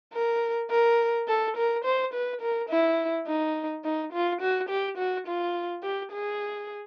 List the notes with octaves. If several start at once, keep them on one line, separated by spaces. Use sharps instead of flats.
A#4
A#4
A4
A#4
C5
B4
A#4
E4
D#4
D#4
F4
F#4
G4
F#4
F4
G4
G#4